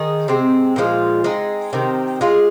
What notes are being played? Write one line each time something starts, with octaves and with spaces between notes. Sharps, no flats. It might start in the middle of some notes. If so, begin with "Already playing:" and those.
Already playing: D#3 D#4 G#4
C3 G#3 C4
A#2 F3 G#3 F4
G#3 C4 D#4
C3 D#3 C4 D#4
G#3 F4 G#4